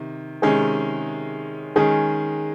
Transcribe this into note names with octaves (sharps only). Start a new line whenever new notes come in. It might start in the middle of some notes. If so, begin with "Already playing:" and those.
Already playing: C3 D#3
C3 D#3 G#3 C#4 G#4
D#3 G#3 C#4 G#4